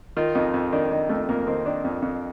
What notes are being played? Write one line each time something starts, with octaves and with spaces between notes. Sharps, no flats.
D#3 F4
F2 D#4
F2
D#3 D4
D#3 D#4
F2 A3
F2 A#3
D#3 C4
D#3 D4
F2
F2